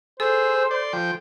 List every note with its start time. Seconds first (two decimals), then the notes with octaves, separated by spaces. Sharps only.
0.20 G#4 A4 C5 E6
0.71 D5 C6
0.93 F3 G5